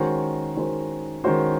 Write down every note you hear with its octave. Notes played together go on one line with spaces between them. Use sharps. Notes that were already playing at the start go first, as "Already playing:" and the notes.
Already playing: D#3 G#3 C#4 F#4 C5
D#3 G#3 C#4 F#4 C5
D#3 G#3 C#4 F#4 C5